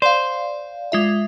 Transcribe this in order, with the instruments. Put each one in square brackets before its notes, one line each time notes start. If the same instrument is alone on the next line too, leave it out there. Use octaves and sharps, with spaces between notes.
[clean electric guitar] C5 [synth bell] D5 F5
[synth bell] G#3 F4 E5